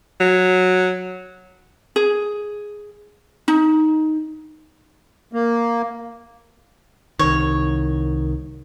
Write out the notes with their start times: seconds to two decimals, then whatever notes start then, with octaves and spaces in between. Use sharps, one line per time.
0.21 F#3
1.96 G#4
3.48 D#4
5.33 A#3
7.19 C2 D#3 C#5